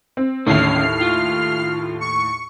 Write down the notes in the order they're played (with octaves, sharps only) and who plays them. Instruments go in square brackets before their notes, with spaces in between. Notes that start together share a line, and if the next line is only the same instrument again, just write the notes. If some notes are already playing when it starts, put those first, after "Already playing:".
[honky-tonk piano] C4
[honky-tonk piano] D#2 A2 [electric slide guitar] D3 C#4 E4 [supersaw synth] F6 C7
[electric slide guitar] F4
[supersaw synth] C#6